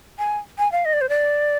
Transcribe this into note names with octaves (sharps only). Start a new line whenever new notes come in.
G#5
G#5
F5
D#5
D5
C5
D5